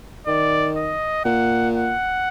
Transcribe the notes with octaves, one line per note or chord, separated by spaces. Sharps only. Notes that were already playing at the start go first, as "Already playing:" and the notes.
D#3 D5
D#5
A#2 F#5
F#5